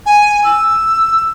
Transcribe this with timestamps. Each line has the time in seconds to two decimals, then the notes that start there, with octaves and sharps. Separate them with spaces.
0.06 G#5
0.44 E6